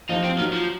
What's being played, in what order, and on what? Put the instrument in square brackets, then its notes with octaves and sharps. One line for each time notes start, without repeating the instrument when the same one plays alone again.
[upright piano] F3 [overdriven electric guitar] D#4
[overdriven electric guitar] C4
[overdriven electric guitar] D#3 [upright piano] F#3
[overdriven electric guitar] F3